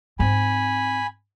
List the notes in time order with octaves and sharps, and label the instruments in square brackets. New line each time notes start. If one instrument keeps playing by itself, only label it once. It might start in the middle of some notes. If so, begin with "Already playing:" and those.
[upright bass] G#2 C4 [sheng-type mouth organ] G#5 B5